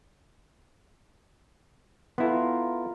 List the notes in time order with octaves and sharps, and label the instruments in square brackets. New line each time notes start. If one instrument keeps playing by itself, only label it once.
[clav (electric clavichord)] B3 E4 A4 [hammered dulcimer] F4 A#4